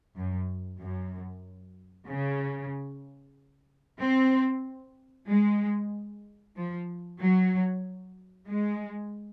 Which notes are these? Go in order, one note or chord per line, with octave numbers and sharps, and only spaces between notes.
F#2
F#2
C#3
C4
G#3
F3
F#3
G#3